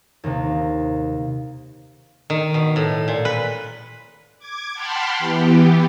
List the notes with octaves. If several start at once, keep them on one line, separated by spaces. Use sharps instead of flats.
D#2 C3
D#3
B2
A2
A#2
B4
D6 G#6
F#5 G5 A5 B5 C6 F6
E3 B3 G4